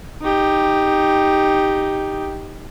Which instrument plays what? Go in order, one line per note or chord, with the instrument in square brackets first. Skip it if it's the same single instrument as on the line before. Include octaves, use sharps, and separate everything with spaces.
[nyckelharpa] D#4 G4